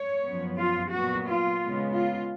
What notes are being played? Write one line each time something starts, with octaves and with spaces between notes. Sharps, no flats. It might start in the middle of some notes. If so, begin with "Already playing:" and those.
Already playing: C#5
F#2 F3 B3
F4
A#2 F#3 B3 F#4
F4
C#3 G#3 B3
F4